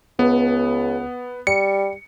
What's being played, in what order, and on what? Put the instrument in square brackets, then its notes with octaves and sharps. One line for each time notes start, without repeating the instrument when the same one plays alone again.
[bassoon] C#2 [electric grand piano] B3
[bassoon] G3 [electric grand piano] C#7